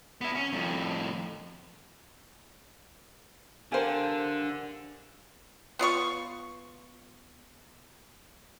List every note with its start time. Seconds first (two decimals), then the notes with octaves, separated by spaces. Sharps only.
0.21 B3 E4
0.35 C#4
0.53 F2 A2
3.72 D3 G4 A#4 C5 F5 G#5
5.79 B3 F4 D5 C#6